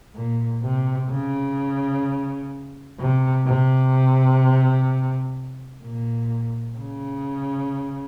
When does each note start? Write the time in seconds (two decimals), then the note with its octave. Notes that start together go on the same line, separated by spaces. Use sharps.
0.15 A#2
0.62 C3
1.10 C#3
2.99 C3
3.46 C3
5.83 A#2
6.78 C#3